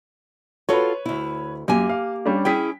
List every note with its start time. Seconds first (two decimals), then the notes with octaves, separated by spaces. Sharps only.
0.69 F4 F#4 A4 B4 C#5
1.06 D2 E4
1.68 F#2 A#3 G4 G#5
1.89 F5
2.26 G3 C#4 D4
2.45 C#4 E4 G#4 G5 B6